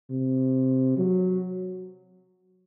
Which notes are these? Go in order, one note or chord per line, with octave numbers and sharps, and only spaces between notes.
C3
F#3